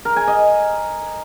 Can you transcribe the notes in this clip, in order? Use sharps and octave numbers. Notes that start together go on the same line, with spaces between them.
A#4
G#5
D#5